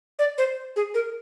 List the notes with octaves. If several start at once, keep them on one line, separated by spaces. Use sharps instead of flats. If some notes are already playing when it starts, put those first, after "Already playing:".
D5
C5
G#4
A#4